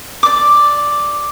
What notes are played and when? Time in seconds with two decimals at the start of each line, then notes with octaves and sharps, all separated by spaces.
0.23 D5 D6